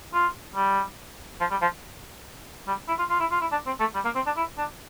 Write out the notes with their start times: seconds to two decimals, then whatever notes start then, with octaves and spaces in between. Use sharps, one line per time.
0.14 F4
0.55 G3
1.40 F3
1.51 G3
1.62 F3
2.68 G3
2.88 E4
2.99 F4
3.10 F4
3.20 E4
3.31 F4
3.41 E4
3.52 D4
3.66 C4
3.80 A3
3.94 G3
4.05 A#3
4.15 C4
4.26 D4
4.36 E4
4.58 D4